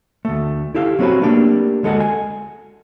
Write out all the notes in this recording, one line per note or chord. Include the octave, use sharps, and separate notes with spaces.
D2 A3
E4 G4 A4 F5
F#3 C4 C#4 F4 F#4 B4
A3 A#3 D4 G4
D2 G#3 A4 D#5 F#5
G#5